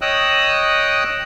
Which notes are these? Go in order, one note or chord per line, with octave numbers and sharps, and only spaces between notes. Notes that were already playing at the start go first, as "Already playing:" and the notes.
C#5 D#5 G5 D#6 E6 F#6